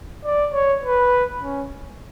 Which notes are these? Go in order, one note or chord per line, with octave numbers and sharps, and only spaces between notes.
D5
C#5
B4
C#4